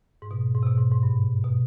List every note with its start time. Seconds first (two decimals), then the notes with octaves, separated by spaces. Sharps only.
0.22 G#2
0.31 B2
0.54 G#2
0.63 C3
0.66 B2
0.78 G#2
0.91 G#2
1.03 G2
1.44 B2